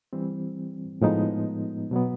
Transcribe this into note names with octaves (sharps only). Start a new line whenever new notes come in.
E3 G3 C4
A2 F3 G#3 B3 D#4
B2 F#3 B3